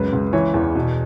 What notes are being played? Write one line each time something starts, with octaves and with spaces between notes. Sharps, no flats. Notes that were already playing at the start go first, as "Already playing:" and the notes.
Already playing: C#2 F#2 B4
C#2
E3 C#5
E2
B2